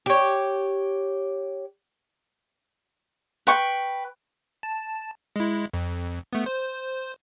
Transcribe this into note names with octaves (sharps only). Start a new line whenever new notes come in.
G4 C#5
B4 G5 C#6
A5
G#3 E4
F2
A3 B3
C5